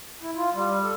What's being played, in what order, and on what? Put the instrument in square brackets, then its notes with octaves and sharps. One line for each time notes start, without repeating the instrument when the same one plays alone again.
[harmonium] E4
F4
G3
A4